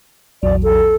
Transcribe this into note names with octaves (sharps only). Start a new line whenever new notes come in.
A#1 E2 F#3 D5
A4